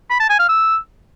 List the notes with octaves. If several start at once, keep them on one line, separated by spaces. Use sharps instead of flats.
B5
A5
G#5
F5
E6